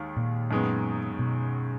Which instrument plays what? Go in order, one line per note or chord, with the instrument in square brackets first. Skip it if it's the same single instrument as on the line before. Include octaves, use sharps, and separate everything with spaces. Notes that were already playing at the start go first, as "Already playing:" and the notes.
Already playing: [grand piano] D#2 D#3 G#3
[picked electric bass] A#2
[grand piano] F#2 D#3 G#3 B3
[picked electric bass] B2